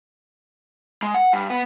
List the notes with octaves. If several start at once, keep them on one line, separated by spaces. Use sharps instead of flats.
G#3
F#5
G2
B3